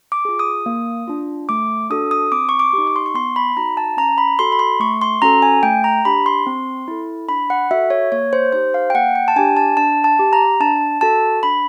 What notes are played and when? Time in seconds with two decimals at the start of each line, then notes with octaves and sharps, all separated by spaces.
0.12 D6
0.25 F4 G#4
0.39 D#6
0.66 A#3
1.08 D4 F4
1.49 A3 D6
1.90 D4 F#4 A4 D#6
2.11 D#6
2.32 C4 D6
2.49 C#6
2.59 D6
2.73 D#4 G4
2.87 C#6
2.96 C6
3.06 C#6
3.14 B3 C6
3.36 B5
3.57 D#4 F#4 A#5
3.77 A5
3.97 C#4 A#5
4.18 B5
4.39 F#4 A4 C6
4.52 B5
4.59 C6
4.80 A3 C#6
5.01 C6
5.22 C#4 F#4 A4 A#5
5.42 G#5
5.63 A3 G5
5.84 A#5
6.05 D4 G4 B5
6.26 C6
6.47 C4
6.88 E4 A4
7.29 D4 B5
7.50 F#5
7.71 F#4 A4 E5
7.90 C#5
8.12 A#3 C#5
8.33 C5
8.52 D#4 G4 C5
8.74 F5
8.90 G5
8.94 A#3 F#5
9.16 G5
9.28 A5
9.36 D4 G4 G#5
9.57 A5
9.77 D4 A5
10.04 A5
10.19 G4
10.33 A#5
10.60 D4 A5
11.01 F#4 A4 A5
11.43 D4 B5